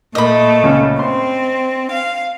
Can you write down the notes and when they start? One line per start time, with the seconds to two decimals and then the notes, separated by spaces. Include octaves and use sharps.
0.15 A#2 A3 A#4 D#5 B5
0.63 C#2 C#4
0.99 C4 C6
1.92 F5